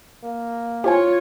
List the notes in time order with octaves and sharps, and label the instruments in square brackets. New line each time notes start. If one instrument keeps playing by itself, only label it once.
[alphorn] A#3
[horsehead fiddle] F4 C#5 [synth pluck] G4 C5 G#5